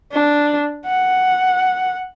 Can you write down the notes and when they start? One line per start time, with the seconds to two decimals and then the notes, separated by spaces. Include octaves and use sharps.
0.12 D4
0.86 F#5